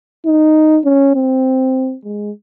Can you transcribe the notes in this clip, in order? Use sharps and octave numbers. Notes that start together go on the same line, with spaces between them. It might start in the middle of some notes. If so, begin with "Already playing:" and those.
D#4
C#4
C4
G#3